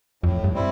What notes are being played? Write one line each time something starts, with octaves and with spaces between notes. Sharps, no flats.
F2 A2
G2
G3 C4 E4